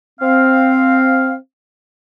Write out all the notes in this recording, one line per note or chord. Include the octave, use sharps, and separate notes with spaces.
C4 F5